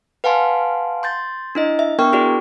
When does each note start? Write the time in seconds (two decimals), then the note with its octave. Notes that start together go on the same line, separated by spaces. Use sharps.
0.24 B4 F5 F#5 G#5 A5 C6
1.03 C6 G6 A6
1.55 D4 E4 D#5
1.79 E5
1.99 B3 D4 A#4 G5 C#6
2.13 E4 F#4 G#4 D5